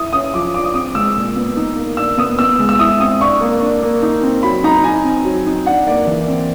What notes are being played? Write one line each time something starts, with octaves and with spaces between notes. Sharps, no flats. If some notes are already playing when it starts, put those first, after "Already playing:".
Already playing: E4 D#6
C#4 D#6
F3 D6
D4 D6
D#6
C4 D#6
G#3 E6
A#2
B3
D#4
A#3
D4 E6
B3 D#6
B3 E6
G#3
E6
E4 D#6
C4 D#6
D4 C#6
A#3
D4
A#3
D#4
C4
F#3 B5
D#4 A#5
D#4 G#5
C4
F#3
D#4
D4 F#5
A#3 D5
E3
C4